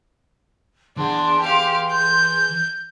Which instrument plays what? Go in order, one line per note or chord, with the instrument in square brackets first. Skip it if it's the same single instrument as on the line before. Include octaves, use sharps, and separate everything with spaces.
[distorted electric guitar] E3 F#5 [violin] D4 [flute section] G#4 C6
[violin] G4 F5
G6